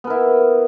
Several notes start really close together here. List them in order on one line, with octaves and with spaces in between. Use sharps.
B3 A#4 E4